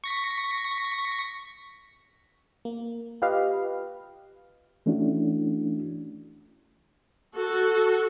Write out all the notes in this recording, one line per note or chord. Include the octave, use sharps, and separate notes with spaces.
C#6 A#6 B6
A#3
F4 G4 B4 D#5 F5
E3 A3 C#4 D4 E4 F#4
F#4 A4